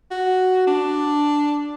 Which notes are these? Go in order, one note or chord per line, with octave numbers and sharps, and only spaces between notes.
F#4
D4